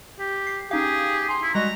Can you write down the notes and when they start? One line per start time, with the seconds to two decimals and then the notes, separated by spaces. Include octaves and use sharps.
0.19 G4
0.47 C7
0.71 C#4 D#4 G4 G#4 F5
1.29 G#5 A#5 C6
1.43 E4
1.55 G3 G#3 F#4 D#5 A#5